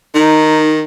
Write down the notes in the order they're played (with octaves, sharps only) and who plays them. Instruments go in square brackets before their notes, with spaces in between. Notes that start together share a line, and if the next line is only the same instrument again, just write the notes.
[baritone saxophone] D#3 [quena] D#4